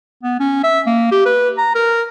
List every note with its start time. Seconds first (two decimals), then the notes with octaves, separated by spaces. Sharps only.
0.23 B3
0.40 C#4
0.63 E5
0.87 A#3
1.11 G4
1.26 B4
1.58 A#5
1.75 A#4